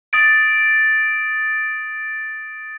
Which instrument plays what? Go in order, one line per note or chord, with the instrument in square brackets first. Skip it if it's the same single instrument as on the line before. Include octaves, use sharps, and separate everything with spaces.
[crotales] D#6 A6 D7